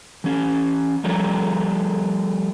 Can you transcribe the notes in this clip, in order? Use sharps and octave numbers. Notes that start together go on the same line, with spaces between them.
E3 C#4
F3 G3 A3 A#4 C#5